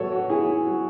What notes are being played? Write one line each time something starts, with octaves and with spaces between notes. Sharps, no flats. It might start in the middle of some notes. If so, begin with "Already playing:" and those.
Already playing: A2 F#3 A4 B4 C#5
F#4
E4 G#4
F#3